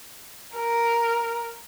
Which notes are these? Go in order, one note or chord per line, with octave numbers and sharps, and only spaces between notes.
A#4